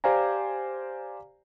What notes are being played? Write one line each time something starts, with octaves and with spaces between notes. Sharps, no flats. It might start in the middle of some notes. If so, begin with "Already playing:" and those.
G4 C5 D5 F5 G#5 A#5